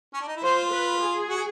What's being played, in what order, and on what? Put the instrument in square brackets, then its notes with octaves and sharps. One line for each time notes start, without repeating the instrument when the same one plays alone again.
[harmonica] C#4
D4
D#4
E4
[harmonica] F4 [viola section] C5
[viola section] B4
G#4
[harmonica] F#4